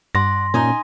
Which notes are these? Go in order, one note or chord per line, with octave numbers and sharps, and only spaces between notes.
G2 D5 F#5 C6 A#6
A#2 C#4 D#4 D#5 G#5